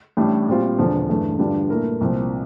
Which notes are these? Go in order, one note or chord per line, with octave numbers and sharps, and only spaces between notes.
A1 A2 G3 D4
A#2 G3 C4 F4
E1 E2 D3 F3
G2 E3 A3
G2 D3 G3 D4 F4
A#2 A3 E4 A#4
C2 A#2 F3 C4